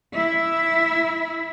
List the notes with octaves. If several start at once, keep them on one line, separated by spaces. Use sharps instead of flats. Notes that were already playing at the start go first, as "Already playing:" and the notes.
E4 E5